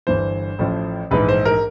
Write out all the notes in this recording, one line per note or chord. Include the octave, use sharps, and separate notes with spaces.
G1 G2 E3 C5
A1 A2 F3
A#1 G#2 E3 B4
C5
A#4